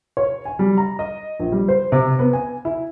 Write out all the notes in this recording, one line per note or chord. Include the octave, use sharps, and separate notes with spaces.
C#5
G#5
G3
A#5
D#5
A#1
G3
C5
C3
B3
G#5
E4